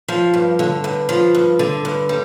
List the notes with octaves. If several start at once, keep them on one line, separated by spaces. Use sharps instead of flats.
F3
G2
D3
G2
F3
G2
D3
G2
G3